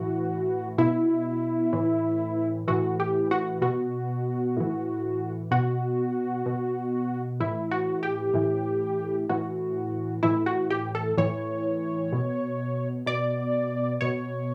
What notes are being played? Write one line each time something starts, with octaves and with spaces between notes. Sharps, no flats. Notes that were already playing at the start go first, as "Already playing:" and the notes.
Already playing: A2 E3 F#4
B2 E4
A2 E3
A2 E3 F#4
G4
F#4
B2 F#4
A2 E3
B2 F#4
B2
A2 E3 E4
F#4
G4
A2 E3
A2 E3 F#4
A2 E3 E4
F#4
G4
A4
A2 E3 C#5
B2
B2 D5
B2 C#5